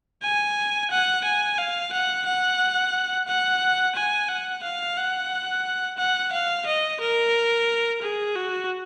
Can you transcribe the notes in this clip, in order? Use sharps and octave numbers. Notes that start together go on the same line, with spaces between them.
G#5
F#5
G#5
F5
F#5
F#5
F#5
G#5
F#5
F5
F#5
F#5
F5
D#5
A#4
G#4
F#4